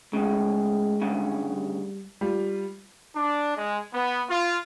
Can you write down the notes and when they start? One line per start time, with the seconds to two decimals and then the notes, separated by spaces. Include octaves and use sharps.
0.13 A2 C#3 G#3
1.02 D2 G2 C#3
1.52 G3
2.21 G3 F4
3.16 D4
3.57 G#3
3.94 B3
4.30 F4